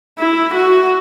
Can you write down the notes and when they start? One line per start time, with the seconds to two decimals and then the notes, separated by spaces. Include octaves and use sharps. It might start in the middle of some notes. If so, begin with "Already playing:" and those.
0.19 E4
0.54 F#4